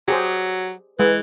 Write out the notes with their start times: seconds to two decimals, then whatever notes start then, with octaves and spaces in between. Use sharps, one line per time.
0.08 F#3 G4 G#4 C5
0.99 E3 G#3 B4